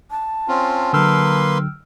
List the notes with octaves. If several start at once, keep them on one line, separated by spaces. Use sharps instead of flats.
A5
C4 C#4 F4
D3 F#3 A#3 B4 G5 C6 E6 F6